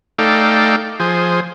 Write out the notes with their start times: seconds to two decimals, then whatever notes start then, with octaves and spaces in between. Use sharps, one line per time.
0.19 A3 D#4 A4 D5 F5 G5
1.00 F3 G#4 C5